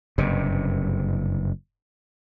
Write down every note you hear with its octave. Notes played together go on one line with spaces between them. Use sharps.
F#1 G2 C3